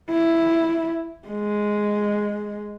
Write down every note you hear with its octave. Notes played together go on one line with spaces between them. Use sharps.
E4
G#3